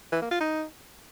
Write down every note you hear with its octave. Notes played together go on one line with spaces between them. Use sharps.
E3
A#3
F4
D#4